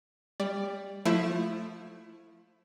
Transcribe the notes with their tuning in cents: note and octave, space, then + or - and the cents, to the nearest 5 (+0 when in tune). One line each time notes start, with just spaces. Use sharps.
G3 +20 D5 +0
F3 +15 A3 +0 E4 +20